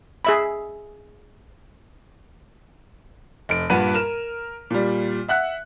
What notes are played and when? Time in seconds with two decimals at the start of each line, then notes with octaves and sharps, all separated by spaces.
0.25 G#4 E5 B5
3.49 F1 D7
3.70 G2 A#2 B4 F#5 D#7
3.94 A#4 F6 E7
4.71 A#2 G3
5.28 E5 F#5 F#6